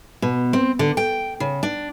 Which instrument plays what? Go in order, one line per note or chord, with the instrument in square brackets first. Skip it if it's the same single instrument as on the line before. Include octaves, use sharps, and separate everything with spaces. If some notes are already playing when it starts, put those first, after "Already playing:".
[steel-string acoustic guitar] B2
C4
D3
G5
C#3
D4